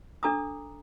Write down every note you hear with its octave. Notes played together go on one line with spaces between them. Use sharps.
D4 A4 A#5 D6 D#6